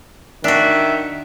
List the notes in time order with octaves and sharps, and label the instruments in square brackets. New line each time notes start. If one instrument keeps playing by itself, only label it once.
[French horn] D#3 [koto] D4 F#4 [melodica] E5